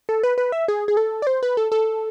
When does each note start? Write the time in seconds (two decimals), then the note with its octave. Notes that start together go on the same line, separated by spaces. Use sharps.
0.09 A4
0.23 B4
0.38 B4
0.52 E5
0.68 G#4
0.88 G#4
0.97 A4
1.22 D5
1.27 C5
1.43 B4
1.57 A4
1.72 A4